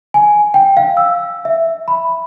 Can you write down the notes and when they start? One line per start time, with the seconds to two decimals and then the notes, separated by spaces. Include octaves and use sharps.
0.14 G#5
0.54 G5
0.77 F5
0.97 E6
1.45 E5
1.88 B5